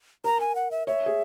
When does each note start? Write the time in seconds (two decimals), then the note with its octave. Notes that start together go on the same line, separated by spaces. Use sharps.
0.24 A#4 A#5
0.41 G#5
0.55 F#5
0.71 E5
0.87 C#5 E5
1.06 G#4